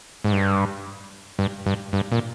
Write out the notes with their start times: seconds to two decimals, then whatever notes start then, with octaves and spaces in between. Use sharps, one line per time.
0.25 G#2
0.32 G2
1.39 G2
1.66 G2
1.93 G2
2.12 A#2